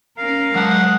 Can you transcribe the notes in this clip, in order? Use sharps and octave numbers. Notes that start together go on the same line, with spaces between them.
C#4 A#4 F5
F#3 G#3 F#5 A5